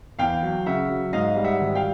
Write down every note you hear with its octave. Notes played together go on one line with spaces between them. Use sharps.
E2 F5 G5
F#3
C#3 E5 F#5
F#3
G#2 D#5 F5
G3
E5 F#5
G#1
F5 G5